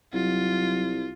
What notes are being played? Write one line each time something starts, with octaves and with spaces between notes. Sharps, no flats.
C2 F#3 F4